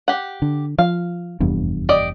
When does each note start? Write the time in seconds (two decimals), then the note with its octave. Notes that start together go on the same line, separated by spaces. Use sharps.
0.08 G4 F#5
0.42 D3
0.78 F3 F5
1.40 F1 E2 G2
1.89 G4 D5 D#5